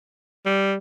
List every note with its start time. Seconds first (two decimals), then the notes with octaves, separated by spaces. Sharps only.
0.46 G3